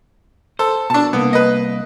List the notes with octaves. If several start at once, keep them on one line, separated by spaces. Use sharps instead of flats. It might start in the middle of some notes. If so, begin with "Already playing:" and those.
A4 C5
B2 D4 A5
C2 A#3 B3
B4 D#5